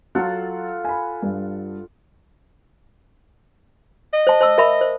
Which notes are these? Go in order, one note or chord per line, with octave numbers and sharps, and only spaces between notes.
F#3 F4 A4 F#5
G#5 B5
G2
D#5
C5 A5
C5 A5 E6
A#4 E5 B5
C5